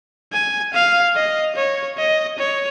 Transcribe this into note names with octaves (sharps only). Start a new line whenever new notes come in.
G#5
F5
D#5
C#5
D#5
C#5